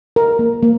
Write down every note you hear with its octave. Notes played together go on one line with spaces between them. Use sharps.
A#4
A#3
A#3